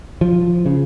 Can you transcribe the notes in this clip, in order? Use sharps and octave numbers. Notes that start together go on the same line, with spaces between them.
F3
C#3